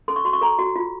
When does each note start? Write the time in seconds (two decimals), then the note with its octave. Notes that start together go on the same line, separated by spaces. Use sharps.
0.08 A4 C6
0.16 C#6
0.25 F#4 C6
0.33 C#6
0.41 A4 A#5
0.59 F#4
0.76 F4